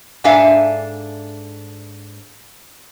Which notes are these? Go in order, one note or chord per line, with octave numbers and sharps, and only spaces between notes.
G#2 D4 A4 E5 F5 G#5